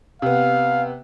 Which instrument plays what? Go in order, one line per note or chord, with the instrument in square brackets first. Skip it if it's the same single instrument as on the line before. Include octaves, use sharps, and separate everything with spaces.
[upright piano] C3 B3 [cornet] F5